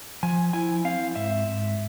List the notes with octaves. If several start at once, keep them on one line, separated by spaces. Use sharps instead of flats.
F3 G#5
E4 G#5
C4 F5
G#2 E5